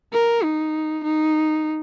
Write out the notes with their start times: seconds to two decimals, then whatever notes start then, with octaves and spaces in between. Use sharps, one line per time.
0.13 A#4
0.44 D#4
1.04 D#4